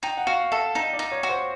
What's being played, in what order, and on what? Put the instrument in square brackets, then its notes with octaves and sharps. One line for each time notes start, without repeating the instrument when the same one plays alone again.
[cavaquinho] D#4 [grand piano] G5
[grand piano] F#5
[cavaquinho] F#4 [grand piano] F5
[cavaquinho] A4 [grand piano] E5
[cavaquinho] D#4 [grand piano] D#5
[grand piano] D5
[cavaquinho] D#4
[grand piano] C#5
[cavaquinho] F#4
[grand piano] C5